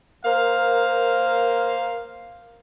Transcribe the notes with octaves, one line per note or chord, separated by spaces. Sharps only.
A#3 A#4 C5 F5